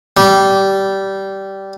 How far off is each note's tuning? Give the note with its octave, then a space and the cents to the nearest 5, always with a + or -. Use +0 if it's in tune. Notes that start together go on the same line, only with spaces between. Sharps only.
G3 -15